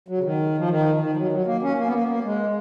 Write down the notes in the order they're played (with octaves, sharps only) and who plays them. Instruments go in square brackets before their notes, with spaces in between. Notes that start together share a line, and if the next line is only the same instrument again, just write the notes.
[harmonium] F#3
C#3
D#3
F3
D#3
D#3
F3
F#3
F#3
A#3
C#4
A#3
B3
A#3
A#3
G#3